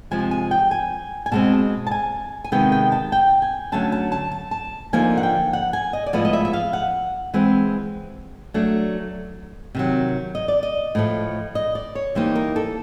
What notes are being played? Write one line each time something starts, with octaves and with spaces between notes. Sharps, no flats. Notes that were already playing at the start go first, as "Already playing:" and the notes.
C3 F3 G#3 G#5
G#5
G5
G#5
G#5
B2 G#3 C4 A5
A5
G#5
G#5
C3 D#3 G#3 B3 G5
G5
A5
G5
G#5
D3 F#3 A3 C#4 A5
A5
A5
A5
A5
D3 F3 A#3 D#4 G#5
F#5
G5
F#5
G#5
D#5
D5
A2 F3 G#3 B3 E4 D#5
D#5
E5
E5
F5
F#5
E3 G#3 C4
F#3 A3 D4
C3 D#3 F#3
D#5
D5
D#5
A2 F3 A3
D#5
D5
C#5
E3 G3 A#3 D#4 C5
A#4
A4